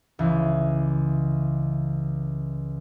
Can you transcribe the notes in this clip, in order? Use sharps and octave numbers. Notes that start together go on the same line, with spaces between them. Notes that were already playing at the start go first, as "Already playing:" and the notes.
C#2 E3